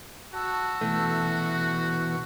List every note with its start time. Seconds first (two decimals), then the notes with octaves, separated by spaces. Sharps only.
0.34 F#4 A5 E6
0.81 B2 E3 A3